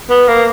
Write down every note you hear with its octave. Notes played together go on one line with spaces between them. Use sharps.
B3
A#3